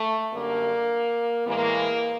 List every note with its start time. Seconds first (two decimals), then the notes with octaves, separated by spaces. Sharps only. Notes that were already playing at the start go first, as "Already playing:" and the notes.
Already playing: A3
0.32 F#2 D3 G3 A#3
1.46 A2 E3 G#3 A#3